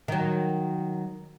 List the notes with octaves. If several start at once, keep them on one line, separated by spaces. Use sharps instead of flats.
D#3 F#3